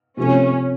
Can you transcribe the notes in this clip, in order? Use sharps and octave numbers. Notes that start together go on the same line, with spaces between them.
C3 F3 A3 C#4